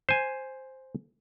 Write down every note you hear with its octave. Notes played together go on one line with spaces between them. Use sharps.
C5 G#5